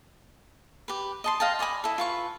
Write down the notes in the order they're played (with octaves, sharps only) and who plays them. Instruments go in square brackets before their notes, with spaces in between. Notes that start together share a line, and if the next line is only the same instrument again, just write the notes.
[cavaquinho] G4 B4
D#5 A5 C6
D#5 F5 G5 A5
D5 D#5 G#5 B5
E4 A4
F4 B4 C#6